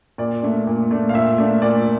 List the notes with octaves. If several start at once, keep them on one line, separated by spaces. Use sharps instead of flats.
A#2 D5
A3 D4
A#2
A3 D4
F5
A#2 E5
A3 D4
A#2 D5